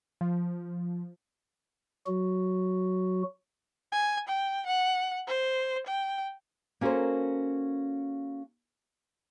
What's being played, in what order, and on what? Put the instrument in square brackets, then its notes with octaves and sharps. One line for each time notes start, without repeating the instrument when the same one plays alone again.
[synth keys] F3
[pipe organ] F#3 F#4
[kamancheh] G#5
G5
F#5
C5
G5
[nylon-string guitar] A#3 C#4 F#4 A4 A#4 C5